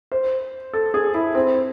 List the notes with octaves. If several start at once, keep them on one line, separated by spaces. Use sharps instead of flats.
C5
A4
G#4
E4
C4